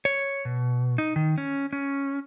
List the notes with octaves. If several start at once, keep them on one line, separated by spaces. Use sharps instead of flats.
C#5
B2
D#4
D#3
C#4
C#4